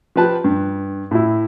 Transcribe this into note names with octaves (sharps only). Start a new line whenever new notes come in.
F3 G4 B4 A5
G2
A2 E4